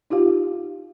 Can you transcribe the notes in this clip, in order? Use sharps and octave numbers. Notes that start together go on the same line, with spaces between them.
D#4 F4 G4 F5